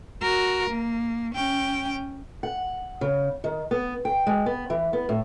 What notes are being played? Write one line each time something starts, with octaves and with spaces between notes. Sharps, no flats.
F#4 A#4
A#3
C#4 G5
F#5
C#3
D#3
B3
G5
G#3
B3
E3
B3
A2